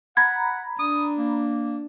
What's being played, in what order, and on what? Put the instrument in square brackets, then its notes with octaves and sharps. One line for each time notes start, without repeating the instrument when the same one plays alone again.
[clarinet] F#5 [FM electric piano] A#5 B5 [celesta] G#6
[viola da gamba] D4 [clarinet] D#6
[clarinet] A#3